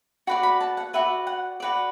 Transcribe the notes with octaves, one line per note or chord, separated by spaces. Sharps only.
F#4 B4 D5 B5
B5
A5
F#5
F#4 B4 D5 E5
F#5
F#4 B4 D5